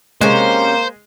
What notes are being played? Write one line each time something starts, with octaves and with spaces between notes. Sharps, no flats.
C3 G#3 A#3 C#4 C5